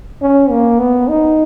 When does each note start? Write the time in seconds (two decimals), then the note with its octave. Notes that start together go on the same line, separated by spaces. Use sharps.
0.22 C#4
0.50 A#3
0.79 B3
1.08 D#4